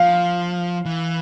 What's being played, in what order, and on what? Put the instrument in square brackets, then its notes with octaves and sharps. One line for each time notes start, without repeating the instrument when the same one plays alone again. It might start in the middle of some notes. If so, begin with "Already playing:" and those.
Already playing: [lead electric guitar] F3 [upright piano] F5
[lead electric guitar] E3